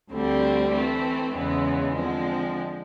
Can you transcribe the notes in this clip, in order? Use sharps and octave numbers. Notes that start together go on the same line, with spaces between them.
D2 D3 G3 C4
E3 A3 C4
E2 C#3 E3 G#3 B3
D3 F3 G#3 C4